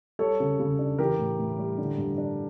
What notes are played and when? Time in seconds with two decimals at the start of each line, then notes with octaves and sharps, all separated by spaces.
0.19 G3 A4 C#5
0.40 C#3
0.60 C#3
0.79 D4
0.98 E3 G4 A#4
1.19 A2
1.39 A2
1.59 G3
1.78 D3
1.98 G2
2.18 D4